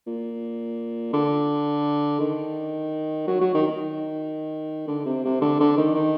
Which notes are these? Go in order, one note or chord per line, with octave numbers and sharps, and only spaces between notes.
A#2
D3
D#3
F#3
F#3
D#3
D#3
D3
C3
C3
D3
D3
D#3
D#3